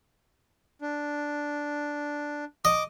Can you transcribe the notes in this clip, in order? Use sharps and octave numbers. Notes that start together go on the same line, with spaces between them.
D4
D#5 D6